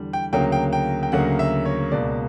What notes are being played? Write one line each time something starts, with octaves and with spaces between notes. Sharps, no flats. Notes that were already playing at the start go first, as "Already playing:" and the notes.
Already playing: E2 D3 G3
G5
D2 C#3 F#3 A#3 G5
G5
G5
G5
D2 C#3 F#3 A#3 F#5
E5
C#5
C#2 B2 A#3 D5